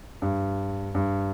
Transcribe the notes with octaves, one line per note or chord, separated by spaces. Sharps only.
G2
G2